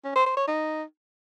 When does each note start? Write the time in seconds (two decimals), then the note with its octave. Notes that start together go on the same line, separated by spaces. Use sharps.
0.05 C#4
0.15 C5
0.26 C5
0.37 C#5
0.47 D#4